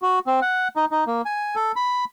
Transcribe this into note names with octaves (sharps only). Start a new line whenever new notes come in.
F#4
C4
F#5
D#4
D#4
A#3
G#5
A4
B5